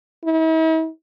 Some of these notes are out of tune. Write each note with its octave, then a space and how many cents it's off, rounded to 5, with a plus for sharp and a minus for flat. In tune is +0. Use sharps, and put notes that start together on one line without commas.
E4 -45